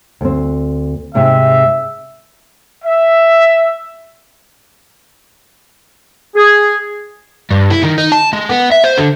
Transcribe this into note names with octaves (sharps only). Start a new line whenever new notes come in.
D2 C4
G#2 C3 G#3 E5
E5
G#4
G2
E4
D#3
D#4
A5
G#3
B3
E5
C5
D3